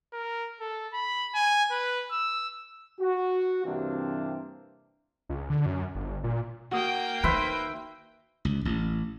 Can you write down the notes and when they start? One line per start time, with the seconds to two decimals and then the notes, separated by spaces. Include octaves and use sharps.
0.13 A#4
0.60 A4
0.93 B5
1.34 G#5
1.71 B4
2.11 E6
3.00 F#4
3.65 G2 C3 E3 A#3 C4 D4
5.29 C#2
5.50 D3
5.66 F#2
5.95 G1
6.24 A#2
6.71 A#3 F#4 G5 D#6
7.24 D#3 B4 C5 E5
8.45 C#2
8.65 A1